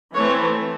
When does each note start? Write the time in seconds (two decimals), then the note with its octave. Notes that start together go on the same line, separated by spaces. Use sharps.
0.14 E3 A3 C4 C#5